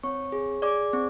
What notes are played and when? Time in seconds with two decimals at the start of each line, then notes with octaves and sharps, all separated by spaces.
0.03 C4 C#5 C#6
0.32 G#4
0.62 G#4 D5 D6
0.93 C4